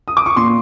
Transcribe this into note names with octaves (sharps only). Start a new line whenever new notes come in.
D#6
D6
C#6
A#2 C6